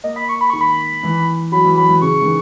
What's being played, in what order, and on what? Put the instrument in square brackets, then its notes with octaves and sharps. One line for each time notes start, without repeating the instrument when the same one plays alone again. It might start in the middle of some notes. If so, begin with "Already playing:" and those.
[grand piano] A#3 [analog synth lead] D#5
[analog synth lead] B5
C#6
B5
[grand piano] D#3 [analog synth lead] C#6
[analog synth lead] B5
[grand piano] E3
[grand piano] F#3 [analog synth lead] B5
[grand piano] E3
[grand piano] F#3 [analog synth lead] B5
[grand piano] E3
[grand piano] C#3 [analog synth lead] C#6
[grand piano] E3
D#3